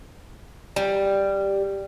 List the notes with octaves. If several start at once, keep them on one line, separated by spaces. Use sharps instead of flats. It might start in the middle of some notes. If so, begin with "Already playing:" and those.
G3